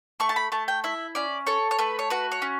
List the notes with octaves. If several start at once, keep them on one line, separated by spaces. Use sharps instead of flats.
A3 C#6
A5
B5
A3 A5
G5
E4 E5
C#4 D5
A4 C#5
C#5
A3 B4
C#5
F#4 B4
C#5
C#4